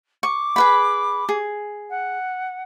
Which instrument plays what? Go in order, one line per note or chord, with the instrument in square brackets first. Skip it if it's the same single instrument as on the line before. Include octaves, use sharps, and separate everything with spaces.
[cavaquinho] C#6 [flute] D6
[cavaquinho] G#4 B4 B5
G#4
[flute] F#5